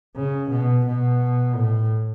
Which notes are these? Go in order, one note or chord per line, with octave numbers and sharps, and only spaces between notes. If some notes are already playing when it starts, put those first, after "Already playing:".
C#3
B2
B2
A2